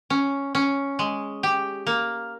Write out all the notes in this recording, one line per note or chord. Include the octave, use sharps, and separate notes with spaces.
C#4
C#4
G#3
G4
A#3